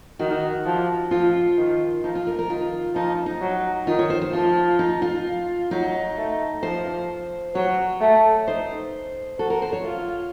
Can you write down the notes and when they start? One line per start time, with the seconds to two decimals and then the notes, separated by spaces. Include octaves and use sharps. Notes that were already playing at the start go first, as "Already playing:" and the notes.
0.19 D#3 F#4
0.66 F3
1.11 F3 F4
1.58 D#3
2.04 F3 D#4
2.15 F4
2.27 A#4
2.39 A#4
2.50 D#3 F4
2.95 F3 D#4
3.26 D#4
3.41 F#3
3.87 D#3 F4
3.99 C#5
4.10 C5
4.22 C5
4.33 F3 F4
4.79 D#4
5.02 F4
5.71 F#3 D#4
6.17 A3
6.63 F3 C5
7.55 F#3 C#5
8.01 A3
8.47 D#4 C5
9.39 F#4 A4
9.50 A#4
9.62 C5
9.73 C#5
9.85 F4